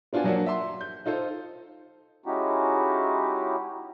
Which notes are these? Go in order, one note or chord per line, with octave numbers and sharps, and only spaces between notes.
B3 D4 F4 F#4 G#5
F3 F#3 A#3 D4 F#4
E5 C6
G6
D#4 F4 A4 C5
G#3 C#4 D#4 E4 F#4 G4